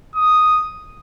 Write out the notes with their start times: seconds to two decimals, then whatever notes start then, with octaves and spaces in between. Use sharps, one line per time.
0.16 D#6